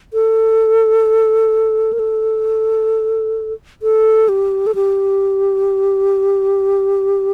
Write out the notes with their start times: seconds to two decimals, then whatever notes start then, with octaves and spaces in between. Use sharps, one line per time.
0.14 A4
1.93 A#4
1.99 A4
3.83 A4
4.29 G4
4.67 A4
4.75 G4